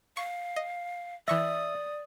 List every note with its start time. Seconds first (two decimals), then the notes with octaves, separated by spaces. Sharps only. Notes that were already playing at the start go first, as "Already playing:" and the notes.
0.17 F5 C#6
0.56 D#5
1.28 E3 D5 E5 C#6 D#6 A#6